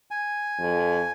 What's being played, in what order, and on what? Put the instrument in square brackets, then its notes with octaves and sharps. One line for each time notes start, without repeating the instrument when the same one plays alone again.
[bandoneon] G#5
[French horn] F2